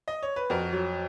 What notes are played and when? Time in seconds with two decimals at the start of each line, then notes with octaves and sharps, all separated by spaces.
0.08 D#5
0.23 C#5
0.36 B4
0.50 F2 F#4 A#4
0.72 F#3